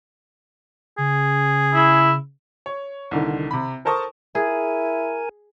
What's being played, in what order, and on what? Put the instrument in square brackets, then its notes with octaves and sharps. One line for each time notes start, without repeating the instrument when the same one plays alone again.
[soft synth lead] C#3 [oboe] G#4
[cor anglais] E4
[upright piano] C#5
C2 D3 D#3
C3 B5
A4 A#4 C5 A5 C#6 D#6
[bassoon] E4 [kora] G#4 [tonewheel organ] A#4 G#5